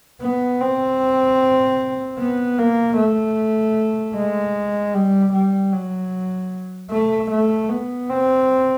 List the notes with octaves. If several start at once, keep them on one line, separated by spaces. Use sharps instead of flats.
B3
C4
B3
A#3
A3
G#3
G3
G3
F#3
A3
A3
B3
C4